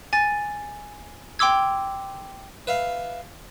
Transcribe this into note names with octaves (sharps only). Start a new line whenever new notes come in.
G#5 A6
G5 C6 D6 E6 G#6
B4 E5 F5